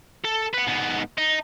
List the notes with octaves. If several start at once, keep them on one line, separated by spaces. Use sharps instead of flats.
A4
B4 F#5
G#2 B3
D#4